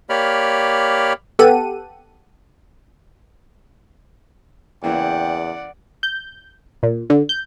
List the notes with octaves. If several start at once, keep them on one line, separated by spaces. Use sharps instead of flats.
A#3 G4 C#5 D5 B5 F6
B3 G4 A4 F#5 D#7
E2 C#3 E3 A#3 D5 F#5 G5
G6
A#2
D3
G6